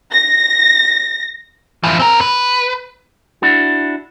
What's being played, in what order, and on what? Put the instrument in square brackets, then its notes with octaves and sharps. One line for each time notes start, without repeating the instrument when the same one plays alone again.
[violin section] A#6
[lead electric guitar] E3 F3
C4 A#4
B4
[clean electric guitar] D4 E4 F#4